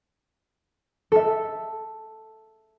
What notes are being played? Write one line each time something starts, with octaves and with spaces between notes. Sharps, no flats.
A4 E5